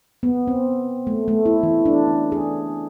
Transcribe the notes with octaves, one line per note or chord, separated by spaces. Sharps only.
B3
C4
A3
A3
E4
E3
D4
C#4
G#4